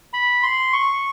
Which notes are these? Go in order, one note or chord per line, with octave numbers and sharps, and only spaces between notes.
B5
C6
C#6